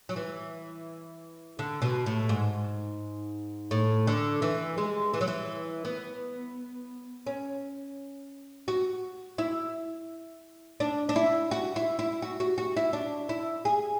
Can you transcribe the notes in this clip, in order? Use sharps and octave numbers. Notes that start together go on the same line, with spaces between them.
F#3
E3
D3
B2
A2
G#2
A2
D3
E3
G#3
E3
F#3
E3
B3
C#4
F#4
E4
D4
D4
E4
F#4
E4
E4
F#4
F#4
F#4
E4
D4
E4
G#4